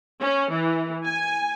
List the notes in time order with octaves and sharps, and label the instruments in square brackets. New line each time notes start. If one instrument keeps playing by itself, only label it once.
[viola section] C#4
E3
G#5